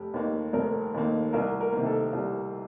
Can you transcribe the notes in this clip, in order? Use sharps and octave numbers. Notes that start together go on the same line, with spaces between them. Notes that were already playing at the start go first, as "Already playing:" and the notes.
Already playing: F1 G4
D#2 D#3 A#3
F1 A#4
D#2 D#3 A#3
C2 A#4
A#4
C3 D#3 A#3
A4
C2 G4